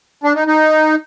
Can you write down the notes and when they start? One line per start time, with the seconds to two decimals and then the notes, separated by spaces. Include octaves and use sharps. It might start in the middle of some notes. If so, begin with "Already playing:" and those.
0.24 D4
0.35 D#4
0.47 D#4